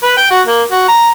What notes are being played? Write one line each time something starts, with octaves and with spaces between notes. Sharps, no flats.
B4
G5
F#4
A#3
F#4
A#5